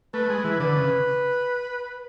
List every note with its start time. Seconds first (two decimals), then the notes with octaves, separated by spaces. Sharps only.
0.14 A3 B4
0.30 G#3
0.44 E3
0.60 D3 B4
0.76 C#3